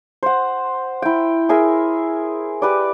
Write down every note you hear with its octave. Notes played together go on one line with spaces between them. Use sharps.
C5 F#5
E4 G5
G#4 A#4 E5
G4 B4 D5